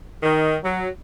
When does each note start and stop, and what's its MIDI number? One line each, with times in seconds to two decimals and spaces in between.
0.22 0.55 51
0.63 0.86 54